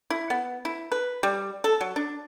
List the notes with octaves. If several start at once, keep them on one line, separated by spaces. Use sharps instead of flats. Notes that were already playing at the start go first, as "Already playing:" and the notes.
E4
B3
E4
B4
G3
A4
F#3
D4